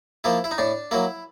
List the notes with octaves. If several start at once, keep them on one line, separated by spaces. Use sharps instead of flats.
F3 A#3 E4
E4
D#4
A2 D4
F#3 A#3 E4